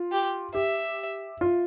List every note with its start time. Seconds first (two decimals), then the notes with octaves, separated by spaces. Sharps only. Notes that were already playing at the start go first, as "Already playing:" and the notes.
Already playing: F4
0.12 G4
0.54 G4 E5
1.41 F4